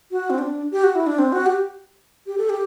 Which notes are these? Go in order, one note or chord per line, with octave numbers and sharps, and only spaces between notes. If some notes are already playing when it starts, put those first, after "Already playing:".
F#4
C4
D4
G4
F#4
E4
D4
C4
F#4
G4
G4
A4
G4